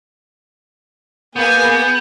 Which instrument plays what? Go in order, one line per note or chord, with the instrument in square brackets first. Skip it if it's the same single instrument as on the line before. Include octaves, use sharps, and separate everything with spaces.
[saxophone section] A#3 [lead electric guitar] B3 [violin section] G#4 B4 G#5 [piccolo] G6